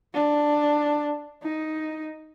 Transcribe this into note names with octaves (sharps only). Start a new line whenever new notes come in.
D4
D#4